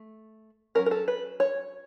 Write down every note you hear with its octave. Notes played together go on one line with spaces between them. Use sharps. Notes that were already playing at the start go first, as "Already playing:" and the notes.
Already playing: A3
F#3 A3 C#4 A#4
A#4
A4
B4
C#5